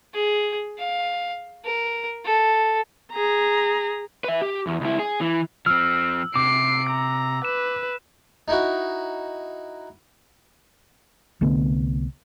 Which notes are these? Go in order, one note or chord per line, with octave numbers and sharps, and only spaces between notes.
G#4
F5
A#4
A4
G#4 A#5
B4 E5
G4
E2
C#2 E4
G#4
E3
F3 C4 E6 F6
C3 D6 C7 D7
A#5
B4 E7
D#4 E4 F#4
C2 D3 A3 B3